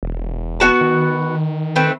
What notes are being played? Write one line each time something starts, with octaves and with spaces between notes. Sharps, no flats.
E1
B3 F#4 A5
D#3
A3 C4 B4